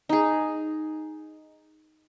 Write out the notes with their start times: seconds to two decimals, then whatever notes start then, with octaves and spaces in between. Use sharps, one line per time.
0.09 D#4 G#4